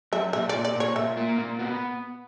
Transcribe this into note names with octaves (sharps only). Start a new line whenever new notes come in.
F#2 E5
A#2 E5
D5
A#2
D5
A#2 C#5
A#2 E5
A#3
A#2
B3